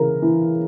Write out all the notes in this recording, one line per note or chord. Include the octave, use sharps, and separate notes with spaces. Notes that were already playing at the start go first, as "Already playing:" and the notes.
Already playing: C#3 E3 A#4
E3